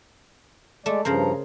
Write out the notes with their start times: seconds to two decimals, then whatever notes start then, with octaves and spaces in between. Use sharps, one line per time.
0.86 G#3 A3 D5
1.05 G2 C#3 F3 A#4 C5 A#5